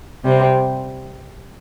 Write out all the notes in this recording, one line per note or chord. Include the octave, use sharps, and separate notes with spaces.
C3 G3 C4